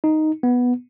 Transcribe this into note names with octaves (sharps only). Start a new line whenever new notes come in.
D#4
B3